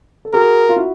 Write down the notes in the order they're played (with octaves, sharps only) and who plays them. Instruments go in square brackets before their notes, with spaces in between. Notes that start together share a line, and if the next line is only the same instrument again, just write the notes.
[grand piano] A4
[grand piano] F#4 G#4 [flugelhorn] A#4
[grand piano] F4
E4 F#4